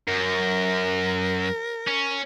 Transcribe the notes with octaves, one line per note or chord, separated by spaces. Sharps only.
F#2 A#4
C#4